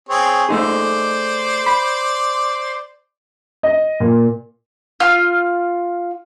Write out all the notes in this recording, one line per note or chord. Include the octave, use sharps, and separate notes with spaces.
C4 G#4 C#5
A3 D#4 G#4 C5 D5
B5
D#5
A#2
F4 F6